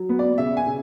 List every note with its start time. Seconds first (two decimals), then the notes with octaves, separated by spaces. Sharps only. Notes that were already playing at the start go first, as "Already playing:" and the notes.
Already playing: F#3
0.09 B3
0.19 D5
0.38 C#3 E5
0.57 G#5
0.66 C#3